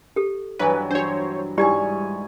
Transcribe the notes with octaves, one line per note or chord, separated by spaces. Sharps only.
G4 A4
G2 E3 F#3 B4
D4 F#4 C5 C#5
G#2 G3 E4 G4 D5 G#5 C#6